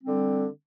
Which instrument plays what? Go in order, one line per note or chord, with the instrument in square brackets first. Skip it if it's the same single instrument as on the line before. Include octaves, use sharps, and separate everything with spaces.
[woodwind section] D3 G3 C4